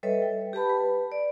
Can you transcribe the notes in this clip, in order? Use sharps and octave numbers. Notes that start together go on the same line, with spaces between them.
G3 A4 B4 C#5 D#5 E5
G5
G4 B4 A5 B5
B4
D5